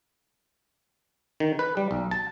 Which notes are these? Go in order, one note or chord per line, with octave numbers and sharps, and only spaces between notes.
D#3
B4
G3
B1
A5